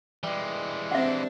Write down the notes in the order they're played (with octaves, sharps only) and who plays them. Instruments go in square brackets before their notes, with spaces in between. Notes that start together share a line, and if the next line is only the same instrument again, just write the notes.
[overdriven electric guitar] E3 G#3 [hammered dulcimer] G3
[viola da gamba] C4 D4 [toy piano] E5 F#5